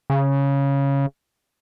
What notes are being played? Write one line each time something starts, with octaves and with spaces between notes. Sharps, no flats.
C#3